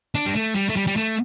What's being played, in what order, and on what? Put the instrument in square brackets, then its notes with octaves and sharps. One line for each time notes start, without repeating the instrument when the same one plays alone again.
[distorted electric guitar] D4
G3
A3
G3
A3
G3
G3
A3